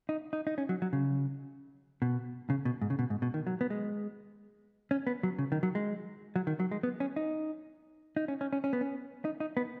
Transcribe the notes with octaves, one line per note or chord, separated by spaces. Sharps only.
D#4
D#4
D#4
C#4
F#3
F#3
C#3
B2
C#3
B2
G#2
C#3
B2
G#2
B2
D#3
F#3
B3
G#3
C#4
B3
F#3
C#3
D#3
F#3
G#3
F#3
D#3
F#3
G#3
B3
C#4
D#4
D#4
C#4
C#4
C#4
C#4
B3
C#4
D#4
D#4
B3